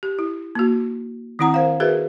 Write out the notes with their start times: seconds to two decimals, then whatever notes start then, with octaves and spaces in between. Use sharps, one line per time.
0.03 G4
0.19 E4
0.55 A#3 F#4
1.39 D#3 C4 E4 F#5 A#5
1.54 A#4 C5 F5
1.80 F#4 G#4 A#4 B4 E5